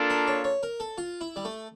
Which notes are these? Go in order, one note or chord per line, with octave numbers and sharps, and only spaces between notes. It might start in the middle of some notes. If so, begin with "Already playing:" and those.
Already playing: A#3 D4 F4 A4
A#4
C#5
C#5
A#4
A4
F4
E4
G3
A3